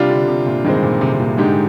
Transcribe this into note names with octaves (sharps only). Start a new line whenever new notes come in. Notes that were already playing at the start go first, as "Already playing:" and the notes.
Already playing: C3 G3 D4 F4
D3
C3
A#2
G2 D#3 G#3 C4
A#2
C3
C3
A#2
G#2 D3 G#3 D#4 G4